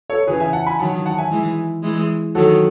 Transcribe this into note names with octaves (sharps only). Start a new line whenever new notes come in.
A4 C#5
C#3 E3 G#4 B4
E5 G#5
F#5 A5
G#5 B5
D#3 F#3 F#5 A5
F#5 A5
E5 G#5
E3 G#3
E3 G#3
D#3 F#3 F#4 A4